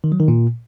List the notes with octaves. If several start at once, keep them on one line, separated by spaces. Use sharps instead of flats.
D#3
F#3
D#3
A#2